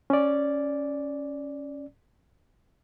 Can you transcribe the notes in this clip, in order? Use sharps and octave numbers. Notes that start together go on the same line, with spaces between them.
C#4 D5